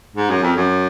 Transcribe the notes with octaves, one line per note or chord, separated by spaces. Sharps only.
G#2
F#2
F2
F#2